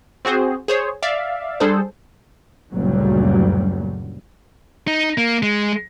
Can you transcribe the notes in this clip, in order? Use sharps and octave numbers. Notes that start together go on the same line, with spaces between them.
C4 F#4 G#4 C5
G#4 C5 C#5
D5 E5 F5
G3 D4 G#4 A4 C5
F#1 D2 A#2 F#3 G3
D#4
A#3
G#3